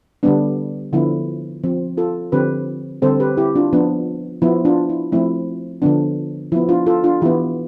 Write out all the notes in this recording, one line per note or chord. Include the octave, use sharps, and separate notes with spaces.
D3 G3 B3 D4
D3 F3 B3 E4
F3 C4
F4 A4
D3 F3 C4 G4 B4
D3 G3 C4 A4 C5
G4 B4
E4 G4
D4 F4
F3 B3 D4
F3 B3 E4
D4 F4
E4
F3 A3 C4 E4
D3 F3 B3 D4
F3 B3 E4
D4 F4
F4 A4
D4 F4
E3 B3 E4 G4